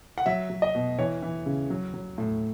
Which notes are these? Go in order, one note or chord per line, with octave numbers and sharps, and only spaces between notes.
F#5
F#3 E5
F#3
D#5
B2
E3 C#5
E3
C#3
F#3
F#3
A2